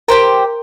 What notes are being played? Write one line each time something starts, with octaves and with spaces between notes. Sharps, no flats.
G4 A#4 C5 G5 A#5